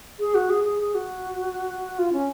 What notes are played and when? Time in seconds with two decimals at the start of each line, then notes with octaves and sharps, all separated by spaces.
0.20 G#4
0.35 F#4
0.50 G#4
0.64 G#4
0.80 G#4
0.95 F#4
1.99 F4
2.13 C#4